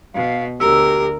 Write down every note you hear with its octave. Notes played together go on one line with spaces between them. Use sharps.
B2 F5
D2 G4 A#4 E6